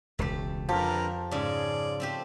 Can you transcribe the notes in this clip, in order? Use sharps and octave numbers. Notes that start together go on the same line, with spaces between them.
E1 C#2 A3 G4
F2 D3 F3 G4 A#4 B4
G#2 C#3 G#4 D5
A3 C4 G4